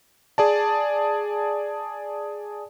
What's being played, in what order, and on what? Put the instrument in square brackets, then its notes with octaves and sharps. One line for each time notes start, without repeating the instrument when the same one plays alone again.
[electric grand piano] G#4 D5 A5